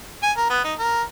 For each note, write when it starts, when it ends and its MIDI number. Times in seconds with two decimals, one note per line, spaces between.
0.23 0.31 80
0.37 0.46 70
0.50 0.60 59
0.64 0.74 63
0.79 1.02 70